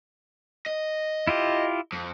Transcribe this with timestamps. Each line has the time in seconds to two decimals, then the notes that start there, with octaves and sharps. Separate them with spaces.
0.66 D#5
1.27 E4 F4 G4
1.93 F2